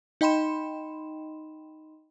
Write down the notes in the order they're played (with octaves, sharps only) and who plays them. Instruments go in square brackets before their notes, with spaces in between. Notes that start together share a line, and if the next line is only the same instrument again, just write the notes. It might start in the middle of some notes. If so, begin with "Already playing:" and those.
[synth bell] D#4 D#5 G5 B5 C6 E7